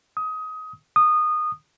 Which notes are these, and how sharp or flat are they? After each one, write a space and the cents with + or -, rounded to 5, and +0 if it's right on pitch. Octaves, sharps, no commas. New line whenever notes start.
D#6 +20
D#6 -20